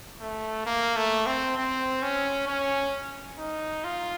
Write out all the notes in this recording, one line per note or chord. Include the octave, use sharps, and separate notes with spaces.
A3
A#3
A3
C4
C4
C#4
C#4
D#4
F4